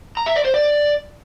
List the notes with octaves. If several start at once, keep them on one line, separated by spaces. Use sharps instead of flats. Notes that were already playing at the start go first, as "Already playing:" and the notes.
A#5
E5
D5
C5
D5